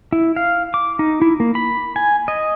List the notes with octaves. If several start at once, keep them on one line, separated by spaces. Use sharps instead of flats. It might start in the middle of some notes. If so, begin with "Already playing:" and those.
E4
F5
D6
D#4
E4
A#3
B5
G#5
D#5